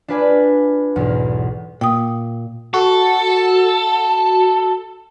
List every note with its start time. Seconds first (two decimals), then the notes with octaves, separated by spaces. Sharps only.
0.08 D4 F4 B4 D5 G#5 B5
0.96 B1 E2 G#2
1.81 A#2 G5 D#6
2.74 F#4 A4